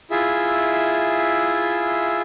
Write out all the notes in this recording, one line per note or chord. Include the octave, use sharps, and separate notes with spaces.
E4 F4 G#4 E5